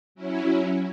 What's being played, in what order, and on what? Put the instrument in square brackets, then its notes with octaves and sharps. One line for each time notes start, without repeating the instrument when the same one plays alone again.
[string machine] F#3 C#4 E4